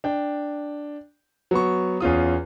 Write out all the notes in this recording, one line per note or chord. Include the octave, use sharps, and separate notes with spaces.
D4 G5
F#3 B3 C#6
E2 C#4 F4 D#6